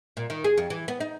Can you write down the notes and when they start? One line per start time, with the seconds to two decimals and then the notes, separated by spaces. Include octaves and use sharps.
0.17 A#2
0.30 D#3
0.44 G#4
0.58 F2
0.70 E3
0.88 B3
1.00 D#4